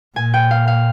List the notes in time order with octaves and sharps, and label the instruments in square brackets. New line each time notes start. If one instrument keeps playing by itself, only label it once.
[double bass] A#2 [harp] G#5
[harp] G5
F5
F5